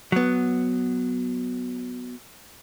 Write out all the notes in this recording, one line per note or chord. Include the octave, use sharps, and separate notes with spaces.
F#3 B3